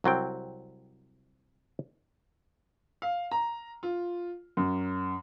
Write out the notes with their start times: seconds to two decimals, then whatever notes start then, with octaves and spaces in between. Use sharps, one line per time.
0.04 C2 F#3 C4 G5
3.02 F5
3.31 A#5
3.83 F4
4.57 F#2